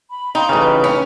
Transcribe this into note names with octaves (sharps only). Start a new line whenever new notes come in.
B5
D#4 F5 G5 C6
A1 C#3 B4 G5 B5
C#4